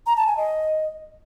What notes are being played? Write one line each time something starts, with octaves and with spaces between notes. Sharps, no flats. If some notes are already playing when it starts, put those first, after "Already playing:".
A#5
A5
G#5
D#5